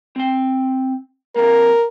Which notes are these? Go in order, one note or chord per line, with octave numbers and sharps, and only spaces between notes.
C4 G5
F2 A#3 A#4